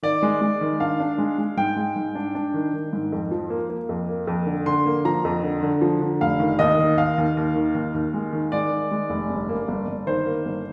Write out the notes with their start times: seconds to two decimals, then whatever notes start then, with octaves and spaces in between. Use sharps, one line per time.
0.03 D#3 D5
0.23 G#3
0.41 G#3
0.61 D#3
0.80 D4 F5
1.00 D4
1.18 G#3
1.38 G#3
1.57 G#2 G5
1.76 G#3
1.96 G#2
2.15 D4
2.35 D4
2.54 D#3
2.73 D#3
2.93 G#2
3.12 F2
3.31 F3
3.50 A#3
3.70 A#3
3.89 F2
4.09 A#3
4.27 F2
4.47 D3
4.66 D3 C6
4.86 A#3
5.05 F3 A#5
5.25 F2
5.43 D3
5.63 D3
5.81 F3
6.01 D3
6.21 F1 F5
6.40 D#3
6.59 D#2 D#5
6.79 D#3
6.97 D#2 F5
7.18 D#2
7.37 D#2
7.56 D#3
7.75 D#2
7.95 D#2
8.14 G#3
8.33 D#3
8.52 G#3 D5
8.71 D#3
8.91 G#3
9.10 F1
9.30 G1
9.49 A#3
9.68 G1
9.87 G1
10.07 D#3 C5
10.26 A#3
10.45 G1